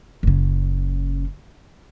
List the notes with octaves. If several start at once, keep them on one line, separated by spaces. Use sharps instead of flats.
F#1 C#3